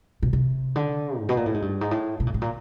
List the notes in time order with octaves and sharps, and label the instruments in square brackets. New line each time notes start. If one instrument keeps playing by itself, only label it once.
[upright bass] B2
C3
D3
G#2
B2
A#2
A2
G#2
G2
G#2
A2
B2
A#2
A2
A#2